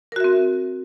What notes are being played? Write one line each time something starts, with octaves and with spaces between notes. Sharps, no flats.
C4 F#4 A#4 E5